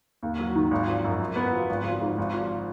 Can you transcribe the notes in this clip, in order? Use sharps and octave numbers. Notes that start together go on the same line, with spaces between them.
D#2
F#3
D#3
G#1
F3
F#2
F#2
B3
F3
G#1
F3
G#2
G#1
F3